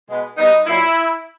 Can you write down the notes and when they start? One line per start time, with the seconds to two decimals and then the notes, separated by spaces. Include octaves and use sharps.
0.09 B2 G#3 B3
0.38 B2 G3 B3 D#4
0.67 A#2 F#3 A#3 E4